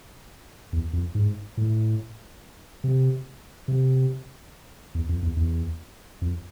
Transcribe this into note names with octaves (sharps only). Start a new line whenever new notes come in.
E2
F2
G#2
A2
C3
C3
E2
F2
E2
E2
F2